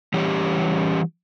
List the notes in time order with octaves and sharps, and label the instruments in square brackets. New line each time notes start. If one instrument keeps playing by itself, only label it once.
[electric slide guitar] E3 G3 C#4 G4